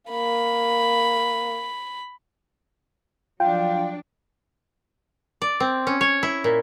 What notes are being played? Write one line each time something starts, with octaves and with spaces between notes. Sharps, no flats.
A#3 B5
F3 F#3 D4 F4 G5
D5
C4
C#4
C#5
E4
A#2